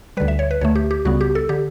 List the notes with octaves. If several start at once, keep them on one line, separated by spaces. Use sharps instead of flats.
D2 D3 G3 B4
E5
C#5
B4
D2 D3 A3 C#5
G4
G4
C#2 C#3 G3 B3 F#4
G4
A4
D3 G4